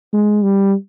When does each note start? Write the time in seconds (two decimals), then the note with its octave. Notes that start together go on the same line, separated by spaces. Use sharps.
0.13 G#3
0.42 G3